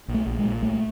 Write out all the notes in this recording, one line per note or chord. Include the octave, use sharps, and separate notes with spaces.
A#1
A3
A#1
G#3
A#2
C2 A3